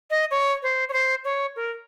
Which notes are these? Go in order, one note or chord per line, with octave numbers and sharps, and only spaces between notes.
D#5
C#5
C5
C#5
C5
C#5
A#4